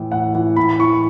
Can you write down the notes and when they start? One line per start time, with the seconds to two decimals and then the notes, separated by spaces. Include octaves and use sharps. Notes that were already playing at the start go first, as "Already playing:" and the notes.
Already playing: A2 E3
0.12 A2 F#5
0.35 E3
0.56 A2 B5
0.79 E3 C#6